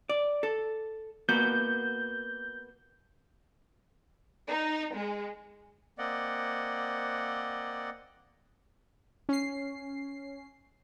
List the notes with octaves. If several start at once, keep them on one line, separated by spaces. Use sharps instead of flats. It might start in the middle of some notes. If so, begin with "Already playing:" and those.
D5
A4
A#3 B3 F#4 G6
D#4
G#3
A#3 C4 D5 D#5 F#5
C#4 C7